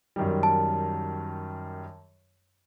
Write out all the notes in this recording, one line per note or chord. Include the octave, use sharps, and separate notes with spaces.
F#2 D#3 G3
A5